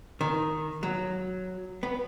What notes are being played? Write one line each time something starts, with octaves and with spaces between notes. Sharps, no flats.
D#3
F#3
B3